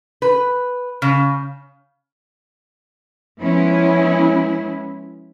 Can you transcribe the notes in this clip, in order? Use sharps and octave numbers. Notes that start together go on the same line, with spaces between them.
B4
C#3
F3 G#3 B3 C#4 E4